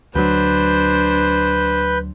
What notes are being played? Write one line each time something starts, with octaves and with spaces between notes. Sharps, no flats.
D2 F#3 D4 B4 C5 G6